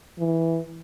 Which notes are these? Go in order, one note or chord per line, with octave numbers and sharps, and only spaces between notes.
E3